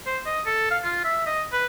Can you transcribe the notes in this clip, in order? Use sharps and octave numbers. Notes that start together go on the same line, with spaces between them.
C5
D#5
A4
F5
F4
E5
D#5
B4